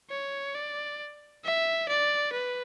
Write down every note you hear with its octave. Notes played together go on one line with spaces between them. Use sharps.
C#5
D5
E5
D5
B4